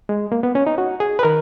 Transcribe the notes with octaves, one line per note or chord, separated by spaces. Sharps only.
G#3
A#3
B3
C#4
D#4
F#4
G#4
B4
D#3 A#4